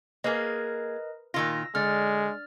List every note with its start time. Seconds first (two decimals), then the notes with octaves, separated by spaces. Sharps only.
0.24 A#3 G#4 A#4 B4 D#5
1.34 A#2 D#3 F4 E6 A#6
1.75 D3 G#3 F6 A6